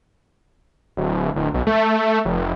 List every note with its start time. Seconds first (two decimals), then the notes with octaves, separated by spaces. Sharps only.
0.97 D1
1.36 D1
1.54 B1
1.67 A3
2.25 F1